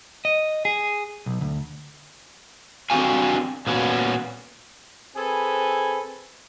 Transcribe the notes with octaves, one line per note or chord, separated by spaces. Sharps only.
D#5
G#4
B1
D2
C4 D4 F#4 G4 F5 G#5
A#2 B3 C#4 F#4
C4 G#4 A4 B4 G#5